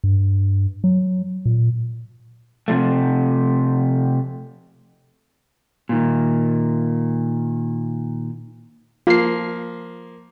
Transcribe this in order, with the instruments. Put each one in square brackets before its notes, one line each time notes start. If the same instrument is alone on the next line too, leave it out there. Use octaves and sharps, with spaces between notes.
[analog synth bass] G2
F#3
A#2
[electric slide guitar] C3 F3 A3
[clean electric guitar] A#2 D#3
[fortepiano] F3 A#3 [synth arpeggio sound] F4 C7